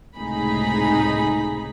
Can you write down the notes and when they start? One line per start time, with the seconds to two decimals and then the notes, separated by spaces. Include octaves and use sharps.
0.18 C#2 A2 C3 D#4 G#4 B5